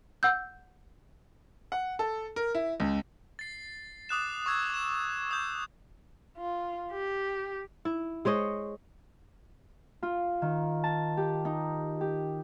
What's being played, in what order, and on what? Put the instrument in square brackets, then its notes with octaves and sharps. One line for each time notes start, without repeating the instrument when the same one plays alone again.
[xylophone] F#5 E6 G6
[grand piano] F#5
A4
A#4
E4
C#2
[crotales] A6 C7
D6 D#6 F#6 E7
C#6 D6 E6 G#6
D6 E7
D#6 G6
[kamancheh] F4
G4
[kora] E4
G#3 C5 C#5 D#5
[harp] F4
D#3
A5
G4
D#4
G4